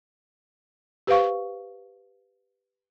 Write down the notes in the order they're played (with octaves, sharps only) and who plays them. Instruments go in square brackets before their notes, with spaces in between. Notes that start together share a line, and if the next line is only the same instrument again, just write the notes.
[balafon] G4 B4 C5 F5 C#6